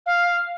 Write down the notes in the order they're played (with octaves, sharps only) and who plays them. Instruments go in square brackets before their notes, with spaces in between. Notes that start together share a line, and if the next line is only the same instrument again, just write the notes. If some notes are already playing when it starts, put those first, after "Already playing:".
[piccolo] F5